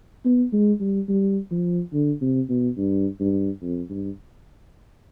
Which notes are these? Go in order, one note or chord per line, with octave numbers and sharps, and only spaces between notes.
B3
G#3
G3
G3
F3
D3
C3
B2
G2
G2
F2
G2